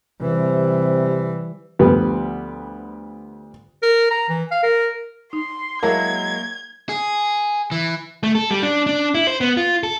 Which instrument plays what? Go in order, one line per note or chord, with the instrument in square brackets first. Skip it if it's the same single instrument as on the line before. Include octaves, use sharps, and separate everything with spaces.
[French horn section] C3 [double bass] E3 G3
[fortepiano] D2 F3 G3 B3
[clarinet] A#4
A#5
E3
F5
A#4
[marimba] D#4 [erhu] C6
[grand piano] F#3 G#3 E4 [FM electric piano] A#3 [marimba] A5 [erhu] G#6
[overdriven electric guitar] G#4
E3
[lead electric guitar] A3
A4
G3
D4
D4
E4
C5
B3
F4
A4